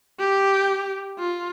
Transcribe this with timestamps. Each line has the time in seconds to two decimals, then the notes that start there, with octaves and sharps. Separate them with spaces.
0.19 G4
1.19 F4